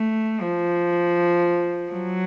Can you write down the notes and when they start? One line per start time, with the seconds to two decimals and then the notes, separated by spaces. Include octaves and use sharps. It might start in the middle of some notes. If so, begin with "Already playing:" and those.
Already playing: A3
0.40 F3
1.91 F#3